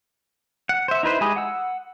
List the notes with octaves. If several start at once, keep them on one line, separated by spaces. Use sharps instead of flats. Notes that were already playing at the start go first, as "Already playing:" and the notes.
F#5
C5 E5
D#4 E4 B4 C5
G#3 G4 G#5 B5 D#6
F#5 E6